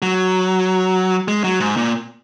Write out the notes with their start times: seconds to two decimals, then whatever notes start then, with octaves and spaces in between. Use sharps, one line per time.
0.02 F#3
1.28 G#3
1.44 F#3
1.60 G#2
1.77 A#2